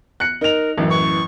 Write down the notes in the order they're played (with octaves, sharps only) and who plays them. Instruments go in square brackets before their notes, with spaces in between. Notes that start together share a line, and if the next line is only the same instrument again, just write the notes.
[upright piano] F#6 C#7
[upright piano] D#4 F7 [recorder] A#4
[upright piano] A1 F#2 E3
[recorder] C#6